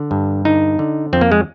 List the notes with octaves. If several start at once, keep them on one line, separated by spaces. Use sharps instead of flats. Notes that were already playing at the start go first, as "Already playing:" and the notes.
Already playing: D3
G2
D3 D#4
D3
F2 C4
A#3
G#3